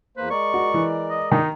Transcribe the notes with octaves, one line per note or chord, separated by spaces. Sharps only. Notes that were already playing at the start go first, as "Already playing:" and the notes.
E2 A#3 B4 C5
G#3 A#4 D5 C#6
F#4
E3
D#5
D#3 D#4